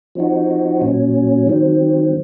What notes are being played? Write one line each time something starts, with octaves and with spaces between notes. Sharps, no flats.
F3 C4 D#4 F#4
A#2 F#3 C#4
D#3 F#3 C4